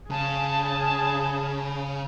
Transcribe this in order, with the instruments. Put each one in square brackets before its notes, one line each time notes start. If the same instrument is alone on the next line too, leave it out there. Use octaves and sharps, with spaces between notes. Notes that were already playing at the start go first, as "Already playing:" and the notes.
[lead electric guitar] C#3 [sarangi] G#4 [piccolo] A5